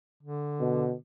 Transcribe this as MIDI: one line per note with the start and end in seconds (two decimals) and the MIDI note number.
0.23 0.95 50
0.60 0.94 47